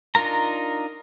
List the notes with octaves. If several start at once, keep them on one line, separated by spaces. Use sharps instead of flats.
D4 D#4 F4 A#4 A#5